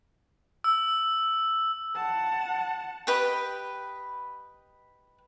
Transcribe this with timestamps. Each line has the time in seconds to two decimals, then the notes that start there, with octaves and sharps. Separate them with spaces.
0.64 E6
1.95 F#5 A5
3.07 G4 B4 D#5 G5